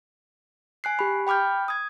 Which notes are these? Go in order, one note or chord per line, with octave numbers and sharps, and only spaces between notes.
G#5 F#6 C7
G4 B5
G5 B5 D6 F6 G6
D#6 G#6